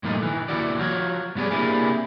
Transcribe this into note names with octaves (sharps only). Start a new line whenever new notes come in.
G2 A#2 D#3 F3 A3 D#4
D#3 E3
D#2 C#3 E4 F#4 D5
F3 F4 F#4 C#5
G#2 G3 B3 G#4 D5
A#3 C4 D4 E4 G4 G#4